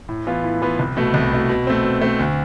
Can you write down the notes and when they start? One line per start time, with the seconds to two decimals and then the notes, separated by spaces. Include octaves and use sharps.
0.09 A2
0.27 E3 B3 F4
0.44 A2
0.62 E3 B3 F4
0.79 C2
0.97 B2 A3
1.14 C2
1.32 B2 A3
1.49 B2
1.67 A3 C4
1.84 B2
2.01 A3 C4
2.19 D2